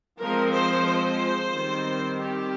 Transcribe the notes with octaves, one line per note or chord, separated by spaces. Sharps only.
F3 G#3 C4 A#4
C5
C5
D#3 G3 C4
G4